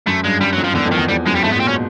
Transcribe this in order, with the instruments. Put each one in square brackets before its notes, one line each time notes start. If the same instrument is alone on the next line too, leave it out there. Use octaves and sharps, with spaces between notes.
[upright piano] F#2 [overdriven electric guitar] A3
[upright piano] G2 [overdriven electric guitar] G#3
[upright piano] F#2 [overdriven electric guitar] G3
[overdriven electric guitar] F#3
[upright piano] F2
[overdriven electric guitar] F3
[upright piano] E2 [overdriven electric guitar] D3
[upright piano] F2
[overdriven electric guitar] D#3
[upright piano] E2
[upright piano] F2 [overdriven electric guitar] G3
[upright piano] F#2 [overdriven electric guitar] G#3
[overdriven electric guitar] G3
[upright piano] G#2 [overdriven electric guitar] A3
[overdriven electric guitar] B3
[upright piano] A#2
[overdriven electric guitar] C4
[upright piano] B2 [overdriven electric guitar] C#4